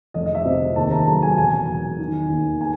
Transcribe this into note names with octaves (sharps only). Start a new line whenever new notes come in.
F1 D#5
D#5
E5
C3
D#2 A5
A#5
F#3 A5
G#5
E1 G#5
E1
D#3
D#2
G#5